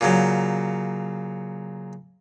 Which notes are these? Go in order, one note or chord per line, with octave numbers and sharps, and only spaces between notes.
A#2 C#3 F#3